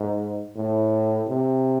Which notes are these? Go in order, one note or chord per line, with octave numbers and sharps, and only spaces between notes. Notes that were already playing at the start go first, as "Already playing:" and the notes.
Already playing: G#2
A2
C3